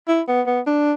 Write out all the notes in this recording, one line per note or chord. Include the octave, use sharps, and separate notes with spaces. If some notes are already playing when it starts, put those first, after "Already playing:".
E4
B3
B3
D4